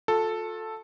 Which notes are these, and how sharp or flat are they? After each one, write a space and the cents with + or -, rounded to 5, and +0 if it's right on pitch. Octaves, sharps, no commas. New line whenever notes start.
F4 +40 A4 +0